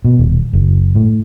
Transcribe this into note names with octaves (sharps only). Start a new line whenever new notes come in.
B2
D#1
F#1
A2